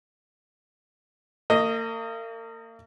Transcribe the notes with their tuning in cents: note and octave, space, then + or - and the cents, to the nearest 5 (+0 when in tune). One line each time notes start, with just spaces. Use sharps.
A#3 -40 D#5 +0